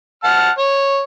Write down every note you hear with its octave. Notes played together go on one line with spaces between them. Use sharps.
F#5 A5 F6
C#5